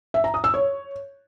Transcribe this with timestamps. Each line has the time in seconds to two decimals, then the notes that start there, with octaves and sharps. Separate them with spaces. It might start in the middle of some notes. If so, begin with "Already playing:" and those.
0.14 E5
0.24 A#5
0.34 D#6
0.44 E6
0.54 C#5